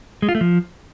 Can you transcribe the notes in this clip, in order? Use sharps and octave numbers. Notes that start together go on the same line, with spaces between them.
G#3
F4
A3
F3